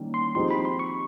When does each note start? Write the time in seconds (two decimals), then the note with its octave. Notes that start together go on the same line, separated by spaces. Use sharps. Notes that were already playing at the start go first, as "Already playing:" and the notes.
Already playing: D#3 G3 A#3 C#4
0.14 C6
0.35 F3 G#3 C4 D#4 G4 C6
0.51 B5
0.65 C6
0.79 C#6